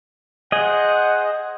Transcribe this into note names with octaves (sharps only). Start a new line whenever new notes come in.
G#4 C5 D#5 F#5